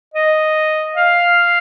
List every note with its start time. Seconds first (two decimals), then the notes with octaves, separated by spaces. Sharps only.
0.14 D#5
0.95 F5